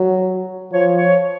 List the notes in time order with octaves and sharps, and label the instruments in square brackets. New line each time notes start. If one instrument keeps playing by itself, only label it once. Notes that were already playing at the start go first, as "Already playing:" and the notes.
Already playing: [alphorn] F#3
[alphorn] F3 [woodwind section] C#5
[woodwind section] C#5